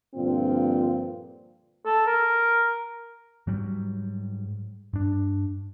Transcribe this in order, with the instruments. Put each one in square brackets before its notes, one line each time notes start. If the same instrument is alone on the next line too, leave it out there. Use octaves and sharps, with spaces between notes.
[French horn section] G2 A#2 D3 F3 C4 F4
[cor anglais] A4
A#4
[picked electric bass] G#2 F#3 G3
G2 D4